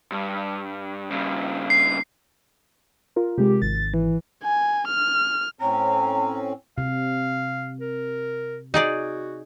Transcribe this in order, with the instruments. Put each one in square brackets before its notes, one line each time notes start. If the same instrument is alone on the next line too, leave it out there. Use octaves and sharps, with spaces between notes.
[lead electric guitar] G2
G2 C#3
[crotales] C7
[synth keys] F4 A#4
[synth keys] C3 G#3 [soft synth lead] G4
[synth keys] G#1 [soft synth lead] A6
[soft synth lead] E3
[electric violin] G#5
F6
[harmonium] A2 C4 C#4 [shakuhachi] A#5
[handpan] C3 [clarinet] F5
[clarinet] A#4
[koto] D#4 G#4 D5 [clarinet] F#4